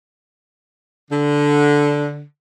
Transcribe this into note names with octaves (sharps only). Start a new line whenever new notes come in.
D3